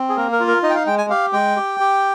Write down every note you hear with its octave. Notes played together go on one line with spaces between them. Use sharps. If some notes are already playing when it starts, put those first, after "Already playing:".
Already playing: C4
G#4
A#3 A#4
A#4
F4
A#4
D#4 D#5
G5
F5
G#3 G5
G#5
G4 F5
G#3 G5
G4
G4